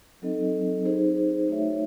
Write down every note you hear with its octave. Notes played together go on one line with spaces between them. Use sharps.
F#3 C4 D#4 A4 D#5
D#4 G#4 C5
A3 D#4 F#4 C#5 E5